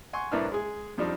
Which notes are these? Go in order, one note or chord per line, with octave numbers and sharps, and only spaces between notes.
F#5 G#5 C6 C#6
C2 A2 D4 A#4 B4 F6
G#3 G#4
F2 F3 G3 D4 D#4